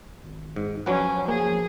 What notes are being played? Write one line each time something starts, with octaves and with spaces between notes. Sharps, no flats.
G#1
G#2
F3 F#3 C#4 B4 F#5
A#3 G#4